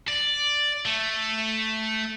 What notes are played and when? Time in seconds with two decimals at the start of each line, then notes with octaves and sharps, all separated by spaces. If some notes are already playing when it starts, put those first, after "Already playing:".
0.08 D5
0.86 A3